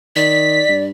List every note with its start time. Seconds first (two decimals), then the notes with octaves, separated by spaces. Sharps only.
0.16 D#3 D5 B6
0.69 G2